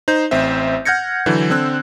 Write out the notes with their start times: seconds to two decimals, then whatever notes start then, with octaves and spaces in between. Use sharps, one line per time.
0.08 D#4 C5 G6
0.31 A1 C4 C5 E5
0.85 F#5 F6 G6 G#6 A#6 C#7
1.26 D3 E3 F#3
1.50 D3 C4 E6 F#6